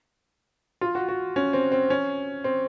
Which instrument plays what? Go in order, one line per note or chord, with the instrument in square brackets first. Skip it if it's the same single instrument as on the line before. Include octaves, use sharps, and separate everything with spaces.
[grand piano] F4
F#4
F#4
C#4
C4
C4
C#4
C4